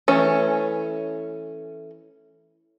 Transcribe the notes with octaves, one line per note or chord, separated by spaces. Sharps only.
E3 A3 C#4